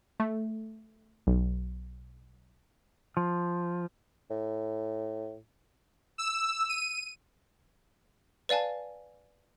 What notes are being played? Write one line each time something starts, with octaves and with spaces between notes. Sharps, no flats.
A3
B1
F3
A2
E6
D#7
B4 D5 F5 G#5 A5